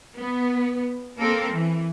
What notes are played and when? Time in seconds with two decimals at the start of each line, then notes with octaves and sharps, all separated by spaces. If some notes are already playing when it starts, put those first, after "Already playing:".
0.16 B3
1.19 A#3 C4 A4 A#4
1.51 E3